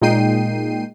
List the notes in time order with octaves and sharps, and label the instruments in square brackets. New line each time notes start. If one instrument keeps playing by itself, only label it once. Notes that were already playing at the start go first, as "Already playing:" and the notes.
[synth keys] A#2 G#3 D#4 G5 C7 D#7